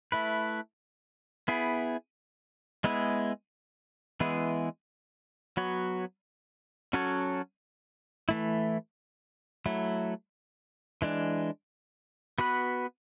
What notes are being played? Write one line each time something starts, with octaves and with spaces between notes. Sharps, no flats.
A3 E4 B4
B3 E4 G#4
G#3 B3 E4 G#4
E3 G#3 B3 E4 G#4
F#3 B3 F#4 C#5
F#3 C#4 F#4 A4 C#5
E3 A3 E4
F#3 A3 E4
E3 G#3 D4
B3 F#4 B4